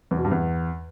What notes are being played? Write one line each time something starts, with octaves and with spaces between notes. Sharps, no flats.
E2
B2
G2
E2